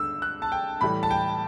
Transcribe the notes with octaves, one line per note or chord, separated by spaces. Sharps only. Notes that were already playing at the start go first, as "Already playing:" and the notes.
Already playing: G2 D3 E6
F#6
A5
G5
A2 E3 G3 B5
A5
G5